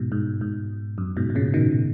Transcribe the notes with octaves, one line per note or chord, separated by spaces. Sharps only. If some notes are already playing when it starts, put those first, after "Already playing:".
Already playing: G#2 B2
G#2
G#2
F#2
G#2 B2
B2
A#2 C#3
B2 D#3